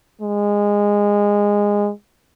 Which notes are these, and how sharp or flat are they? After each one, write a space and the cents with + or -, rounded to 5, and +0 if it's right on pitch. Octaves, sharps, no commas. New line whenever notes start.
G#3 -20